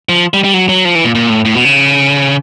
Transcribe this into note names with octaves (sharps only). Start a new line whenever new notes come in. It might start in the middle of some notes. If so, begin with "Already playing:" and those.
F3
G3
G3
F#3
F#3
F3
E3
A#2
A#2
A2
A2
B2
C#3